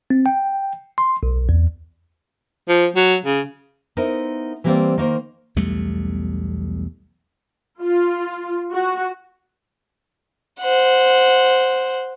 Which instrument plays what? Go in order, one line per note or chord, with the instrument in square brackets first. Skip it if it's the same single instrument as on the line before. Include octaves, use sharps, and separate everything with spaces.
[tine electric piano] C4
G5
C6
B1
E2
[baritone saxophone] F3
F#3
C#3
[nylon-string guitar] B3 D#4 E4 A#4 C5
E3 G3 A#3 C4 C5 D5
D#3 A#3 C5
[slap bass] B1 E2 G3 A3
[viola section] F4
F#4
[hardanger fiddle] C5 F#5